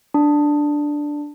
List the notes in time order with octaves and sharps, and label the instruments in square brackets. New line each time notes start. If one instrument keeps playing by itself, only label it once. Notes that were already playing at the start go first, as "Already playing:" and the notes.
[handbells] D4